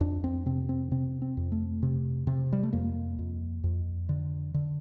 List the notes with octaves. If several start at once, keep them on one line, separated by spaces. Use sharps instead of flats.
F2 D4
C4
C3 C4
C4
C3 C4
C4
F2
A3
C3
C3
G3
A3
F2 A#3
F2
F2
D3
D3